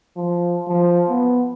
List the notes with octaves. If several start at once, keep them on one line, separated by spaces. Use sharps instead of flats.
F3
F3
B3